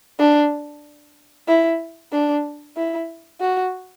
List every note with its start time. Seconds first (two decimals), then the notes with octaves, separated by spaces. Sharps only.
0.19 D4
1.48 E4
2.12 D4
2.77 E4
3.41 F#4